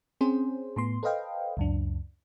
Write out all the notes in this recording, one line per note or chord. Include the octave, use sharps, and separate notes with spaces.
C4 C#4 G#4 C5
A2 B3 C6
A4 B4 C5 D#5 F5 G5
C#2 F#2 D4